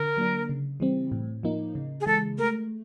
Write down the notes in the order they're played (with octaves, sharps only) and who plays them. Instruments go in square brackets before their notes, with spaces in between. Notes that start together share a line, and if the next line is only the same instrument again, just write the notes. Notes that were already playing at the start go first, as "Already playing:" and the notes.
Already playing: [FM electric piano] D3 [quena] A#4
[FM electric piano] F#3 A#3 D4
C#3
E3 G3 C4
A2
F3 A#3 D#4
C#3
[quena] G#4
[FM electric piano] E3 G#3 [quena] A4
[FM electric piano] A3 [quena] A#4